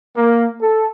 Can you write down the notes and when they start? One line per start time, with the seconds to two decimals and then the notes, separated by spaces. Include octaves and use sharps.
0.15 A#3
0.61 A4